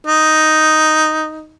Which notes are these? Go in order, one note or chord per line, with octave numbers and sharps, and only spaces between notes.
D#4